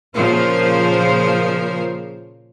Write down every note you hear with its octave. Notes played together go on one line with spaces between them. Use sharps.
A#2 C#3 F3 F4 A#4 C5